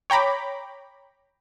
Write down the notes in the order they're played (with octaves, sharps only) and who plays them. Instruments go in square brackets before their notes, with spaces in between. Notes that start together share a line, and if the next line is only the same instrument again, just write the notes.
[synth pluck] C#5 G5 A#5 B5 D6